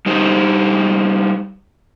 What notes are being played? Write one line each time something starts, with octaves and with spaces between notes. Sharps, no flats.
G3 D#4 G4 C5